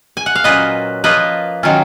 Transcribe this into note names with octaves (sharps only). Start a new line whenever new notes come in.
G#5
F#5
F5
A#2 F#3 A#3 C#4 F4 B4 D#5
F3 A#3 F4 B4 D#5
D#3 F#3 C#4 F4